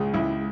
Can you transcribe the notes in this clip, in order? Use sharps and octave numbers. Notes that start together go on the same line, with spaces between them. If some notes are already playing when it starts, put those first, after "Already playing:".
Already playing: C#2 C#3 G#4
C#2 E4